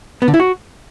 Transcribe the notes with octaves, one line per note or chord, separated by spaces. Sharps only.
B3
D3
E4
F#4